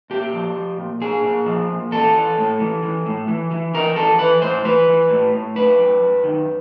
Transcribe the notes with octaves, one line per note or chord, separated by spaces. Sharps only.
A#2 G4
F3
F3
A#2
A#2 G#4
A#2
F3
A#2
E3 A4
E3
A2
E3
E3
A2
E3
E3
E3 A#4
E3 A4
E3 B4
A2 C5
E3 B4
E3
A2
A2
F#2 B4
F#2
F#2
D#3